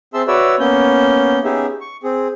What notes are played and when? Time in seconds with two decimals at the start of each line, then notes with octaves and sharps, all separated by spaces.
0.14 C4 G#4 E5 A5 C6 E6
0.28 F#4 B4 C#5 D5 E5 E6
0.60 A#3 B3 C#4 G6
1.44 B3 C#4 D#4 G4 G#4 E5
1.81 C#6
2.04 C4 G#4